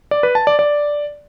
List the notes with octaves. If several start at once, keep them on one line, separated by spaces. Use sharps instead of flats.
D5
B4
A5
D5
D5